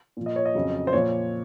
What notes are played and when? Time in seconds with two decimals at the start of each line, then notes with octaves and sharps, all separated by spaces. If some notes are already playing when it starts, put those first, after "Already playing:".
0.17 A#2 F3
0.26 D#5
0.36 C#5
0.45 D#5
0.55 F2 C#3 F#3
0.87 C5
0.93 A#2 F3 C#5